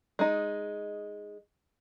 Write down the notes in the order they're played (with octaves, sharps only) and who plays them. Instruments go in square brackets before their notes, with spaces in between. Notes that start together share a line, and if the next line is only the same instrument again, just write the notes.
[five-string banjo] G#3 D#4